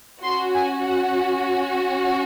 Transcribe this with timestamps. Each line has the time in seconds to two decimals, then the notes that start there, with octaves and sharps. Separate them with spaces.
0.23 C#4 F#4 C6
0.54 G#5
0.85 F#5